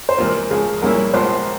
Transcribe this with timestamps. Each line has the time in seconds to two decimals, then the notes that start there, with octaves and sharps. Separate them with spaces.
0.09 C5
0.18 C#2 C3 E3 A#3 F4 A#4
0.50 C#2 C#3 F3 G#4
0.82 C2 A#2 G#3 C#4 E4 A#4
1.14 A#1 G#2 F3 A#3 C5